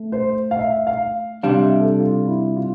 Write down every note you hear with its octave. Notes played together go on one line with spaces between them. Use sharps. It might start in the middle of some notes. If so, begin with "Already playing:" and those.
Already playing: A3
C5
F5
E5
F5
C3 G3 D4 F5
E5
A4
F4
E4
F4